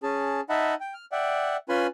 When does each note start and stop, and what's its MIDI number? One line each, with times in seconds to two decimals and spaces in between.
0.03 0.41 61
0.03 0.41 68
0.03 0.41 81
0.49 0.74 63
0.49 0.74 75
0.49 0.74 76
0.49 0.74 78
0.49 0.74 81
0.49 0.74 83
0.81 0.94 79
0.94 1.05 89
1.12 1.57 74
1.12 1.57 76
1.12 1.57 78
1.12 1.57 79
1.69 1.87 61
1.69 1.87 65
1.69 1.87 71
1.69 1.87 80
1.69 1.87 83
1.69 1.87 84